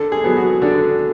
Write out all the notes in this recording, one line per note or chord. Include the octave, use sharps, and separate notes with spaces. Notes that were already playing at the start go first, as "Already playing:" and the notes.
Already playing: D3 A4
G#4
F#3 B3
F#4
D3 D4